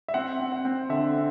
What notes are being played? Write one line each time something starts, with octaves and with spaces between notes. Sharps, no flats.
E5
C4 F#5
C4
F#5
C4
D3 E5
C4